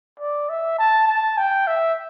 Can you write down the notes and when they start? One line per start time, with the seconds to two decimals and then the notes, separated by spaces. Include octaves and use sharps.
0.20 D5
0.50 E5
0.78 A5
1.08 A5
1.38 G5
1.67 E5